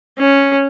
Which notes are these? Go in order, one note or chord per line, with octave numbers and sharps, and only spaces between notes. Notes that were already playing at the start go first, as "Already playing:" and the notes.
C#4